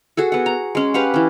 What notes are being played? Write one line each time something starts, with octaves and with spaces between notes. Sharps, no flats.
F#4 G#4 A4
B3 F#5
A#5
G#3 C#4
G4 B4 F5 F#5
E3 C#4